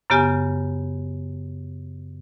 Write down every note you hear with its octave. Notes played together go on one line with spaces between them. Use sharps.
F#2 C#3 B3 G4 G#5 F6